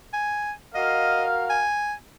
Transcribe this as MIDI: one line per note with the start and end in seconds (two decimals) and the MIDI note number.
0.13 0.52 80
0.75 1.63 66
0.75 1.63 70
0.75 1.25 75
0.75 1.63 77
1.50 1.93 80